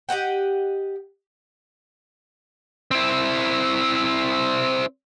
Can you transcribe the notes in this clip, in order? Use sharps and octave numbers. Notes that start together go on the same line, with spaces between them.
G4 D#5 F#5 G5
C4 E4